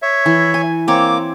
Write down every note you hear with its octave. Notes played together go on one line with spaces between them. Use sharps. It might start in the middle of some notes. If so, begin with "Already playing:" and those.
C#5 E5
E3
G#5
A#3 C4 C#5 D6